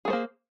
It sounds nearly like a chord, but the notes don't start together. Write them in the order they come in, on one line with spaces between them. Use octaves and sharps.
G#4 A3 C5 A#3